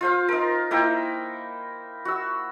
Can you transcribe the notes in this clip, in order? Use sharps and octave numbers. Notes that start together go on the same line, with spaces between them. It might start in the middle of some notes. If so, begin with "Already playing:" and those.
F4 C5 F5
D#4 A#4
A#3 D#4 E4 G5
F#4 E6